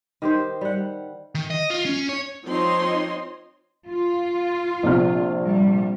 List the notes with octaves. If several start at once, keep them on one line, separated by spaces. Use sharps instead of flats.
D#3 G4 C5
G3 F#5
D#3
D#5
F4
C#4
C#5
F3 C4 D#4 C#5 D#5 C6
F4
A#1 C3 F6
G3